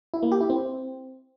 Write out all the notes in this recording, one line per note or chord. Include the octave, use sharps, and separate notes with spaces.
E4
A#3
G4
E4
C4